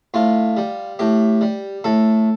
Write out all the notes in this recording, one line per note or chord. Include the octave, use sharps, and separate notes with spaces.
A2 F4
G3
A2 G4
G3
A2 A4